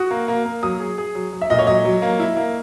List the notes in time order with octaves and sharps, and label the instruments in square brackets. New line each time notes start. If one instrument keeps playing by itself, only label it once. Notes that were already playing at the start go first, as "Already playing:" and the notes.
Already playing: [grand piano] F#4 [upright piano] D#6
[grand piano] A#3
A#3
A#3
[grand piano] F#3 [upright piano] D#6
[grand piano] G#4
G#4
F#3
F#3
[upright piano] E5
[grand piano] A#2 [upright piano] D#5
[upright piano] C#5
[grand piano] F#3 [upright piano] D#5
[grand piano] F#3
A#3
E4
A#3